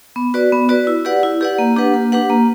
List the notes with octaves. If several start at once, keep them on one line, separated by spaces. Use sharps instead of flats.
B3
F#4 B4 D5
B3
F#4 B4 D5
E4
G4 B4 D5 F#5
E4
G4 B4 D5 F#5
A#3
D4 G4 B4 F#5
A#3
D4 G4 B4 F#5
A#3